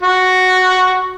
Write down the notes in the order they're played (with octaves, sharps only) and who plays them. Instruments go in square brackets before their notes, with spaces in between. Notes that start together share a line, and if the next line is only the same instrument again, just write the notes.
[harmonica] F#4